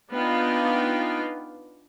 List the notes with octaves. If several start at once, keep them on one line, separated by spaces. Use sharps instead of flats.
B3 D4 D#4 F4 F5 G5